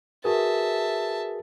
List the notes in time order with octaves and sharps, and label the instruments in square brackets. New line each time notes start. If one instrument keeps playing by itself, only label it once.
[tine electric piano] F#4 G#4 B4 [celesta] A#4 [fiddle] E5 A5